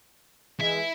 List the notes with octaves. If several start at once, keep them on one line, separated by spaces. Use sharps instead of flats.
E3 G#3 E4 E5